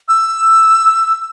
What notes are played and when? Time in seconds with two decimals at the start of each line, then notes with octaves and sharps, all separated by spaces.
0.08 E6